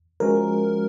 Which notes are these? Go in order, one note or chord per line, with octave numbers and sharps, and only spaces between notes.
F3 G#3 C#4 F#4 A#4